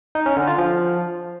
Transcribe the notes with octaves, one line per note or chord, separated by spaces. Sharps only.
D#4
C#4
D3
F4
F3